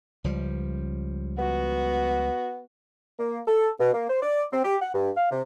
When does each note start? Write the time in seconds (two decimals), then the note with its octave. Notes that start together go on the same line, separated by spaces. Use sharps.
0.24 C#2 F3 G3
1.39 B3 F#4
3.19 A#3
3.47 A4
3.79 B2
3.93 A#3
4.09 C5
4.22 D5
4.53 C4
4.64 G4
4.81 F#5
4.94 G2
5.17 F5
5.31 C3